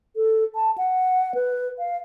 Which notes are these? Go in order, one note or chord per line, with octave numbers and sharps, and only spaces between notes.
A4
A5
F#5
B4
F5